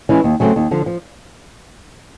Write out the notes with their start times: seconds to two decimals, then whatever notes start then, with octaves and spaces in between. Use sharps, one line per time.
0.09 E3 G#3 C#4 E4
0.24 D#2
0.40 C#3 F#3 A3 C4
0.56 D#2
0.71 D3 F3
0.86 F3